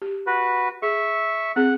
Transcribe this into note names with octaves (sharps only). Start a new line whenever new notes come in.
G4
F#4 B4
G#4 E5 C#6
C4 G#4 F#5